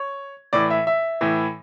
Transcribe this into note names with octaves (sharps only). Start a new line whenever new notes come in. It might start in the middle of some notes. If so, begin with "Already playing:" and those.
Already playing: C#5
A2 E3 D5
E5
E5
A2 E3